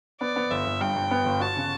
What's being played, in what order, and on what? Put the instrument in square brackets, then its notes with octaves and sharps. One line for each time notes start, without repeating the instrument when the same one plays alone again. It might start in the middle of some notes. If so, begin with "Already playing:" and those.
[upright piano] B3 [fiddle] D5
[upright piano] B3
[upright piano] G1 [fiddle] E5
[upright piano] G1
[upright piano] G2 [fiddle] G5
[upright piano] G2
B3
G1
[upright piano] F#4 [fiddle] A5
[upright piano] C#3